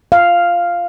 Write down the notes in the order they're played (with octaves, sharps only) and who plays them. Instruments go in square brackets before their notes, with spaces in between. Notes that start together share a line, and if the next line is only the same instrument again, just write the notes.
[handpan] F5